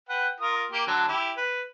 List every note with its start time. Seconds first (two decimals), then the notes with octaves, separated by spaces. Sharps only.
0.09 B4 F#5 G5
0.40 F4 A#4 D#6
0.71 A#3 G4
0.87 D3 F#3 A5
1.08 E4 G4
1.37 B4